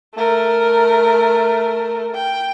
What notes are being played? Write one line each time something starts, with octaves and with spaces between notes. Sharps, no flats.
A3 A#4
G5